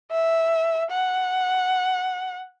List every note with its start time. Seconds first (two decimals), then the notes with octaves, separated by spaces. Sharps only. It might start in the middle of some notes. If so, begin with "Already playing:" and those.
0.12 E5
0.91 F#5